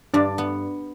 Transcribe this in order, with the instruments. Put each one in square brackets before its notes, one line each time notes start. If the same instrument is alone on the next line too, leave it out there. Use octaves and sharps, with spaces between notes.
[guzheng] G2 [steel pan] D4 D5
[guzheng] B3